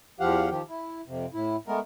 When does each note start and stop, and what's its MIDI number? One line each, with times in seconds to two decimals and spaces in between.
0.20 0.49 40
0.20 0.49 53
0.20 0.49 67
0.20 0.49 77
0.20 0.49 78
0.50 0.62 51
0.50 0.62 53
0.50 0.62 67
0.69 1.01 64
1.07 1.26 41
1.07 1.26 48
1.34 1.56 45
1.34 1.56 64
1.68 1.80 56
1.68 1.80 57
1.68 1.80 59
1.68 1.80 70